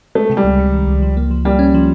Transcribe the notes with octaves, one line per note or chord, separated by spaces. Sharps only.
G#3 A3
C3
G3
C#2
C3
D#3
C#2
F3
A#3
F3
G3 A#3
C#4
F3